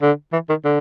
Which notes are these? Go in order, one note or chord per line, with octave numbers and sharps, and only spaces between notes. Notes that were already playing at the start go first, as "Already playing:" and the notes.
D3
E3
D#3
D3